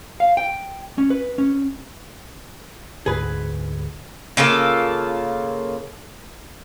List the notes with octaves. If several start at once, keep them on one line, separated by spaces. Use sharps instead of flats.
F5
G5
C#4
B4
C#4
D2 G#2 D3 G#4 B4
C#3 A#3 F4 A4